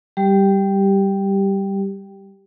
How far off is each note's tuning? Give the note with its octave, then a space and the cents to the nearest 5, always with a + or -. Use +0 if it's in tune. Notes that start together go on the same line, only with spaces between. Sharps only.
G3 +0 G4 +0